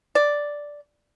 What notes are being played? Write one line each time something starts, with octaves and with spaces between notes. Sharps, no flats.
D5